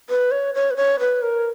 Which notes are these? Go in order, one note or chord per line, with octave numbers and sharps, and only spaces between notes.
B4
C#5
C#5
B4
C#5
B4
A#4